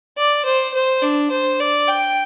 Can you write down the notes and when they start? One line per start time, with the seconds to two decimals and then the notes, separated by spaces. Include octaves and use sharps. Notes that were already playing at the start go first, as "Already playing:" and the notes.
0.17 D5
0.45 C5
0.73 C5
1.02 D4
1.31 C5
1.59 D5
1.87 G5